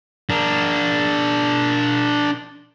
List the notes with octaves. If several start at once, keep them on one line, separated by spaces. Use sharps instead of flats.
D4 A#4